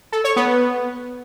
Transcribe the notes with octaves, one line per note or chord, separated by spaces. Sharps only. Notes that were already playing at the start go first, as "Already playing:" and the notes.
A4
C#5
B3